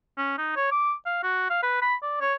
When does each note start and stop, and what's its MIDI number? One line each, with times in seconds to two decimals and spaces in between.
0.17 0.34 61
0.38 0.53 63
0.56 0.69 73
0.71 0.94 86
1.06 1.20 77
1.23 1.48 66
1.50 1.61 77
1.63 1.78 71
1.82 1.95 83
2.02 2.18 74
2.21 2.34 73